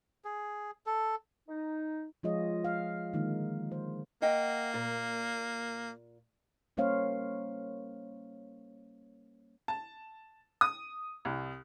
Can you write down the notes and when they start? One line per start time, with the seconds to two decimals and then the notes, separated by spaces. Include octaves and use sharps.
0.25 G#4
0.86 A4
1.49 D#4
2.23 F3 G#3 F4 G#4 C#5 D#5
2.65 F5
3.13 D3 D#3 G#3 A#3 D#4
3.72 C5
4.22 A#3 D#5 F#5 G5
4.74 A#2
6.77 G3 A#3 C#4 C5 C#5 F5
9.68 A5
10.61 D#6
11.25 C2